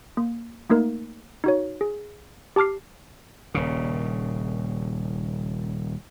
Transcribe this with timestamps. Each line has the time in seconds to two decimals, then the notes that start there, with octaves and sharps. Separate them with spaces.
0.17 A#3
0.70 A3 A#3 D#4 A#4
1.44 D#4 F#4 C#5
1.81 G#4
2.56 G4 A5 D6 F6 C7
3.54 D#1 C#3